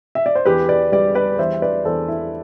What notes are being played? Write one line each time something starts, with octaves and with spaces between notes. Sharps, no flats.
E5
D5
C5
E2 G4 B4
B4 D5
G3 B4 D5
B4 D5
E2 C5 E5
B4 D5
E2 A4 C5
E4